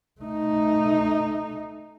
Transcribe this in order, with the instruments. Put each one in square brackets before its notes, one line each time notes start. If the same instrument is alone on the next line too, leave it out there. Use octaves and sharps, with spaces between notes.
[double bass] A3 D#4